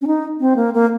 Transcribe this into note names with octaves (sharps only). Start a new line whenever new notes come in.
C#4
D#4
C4
A#3
A#3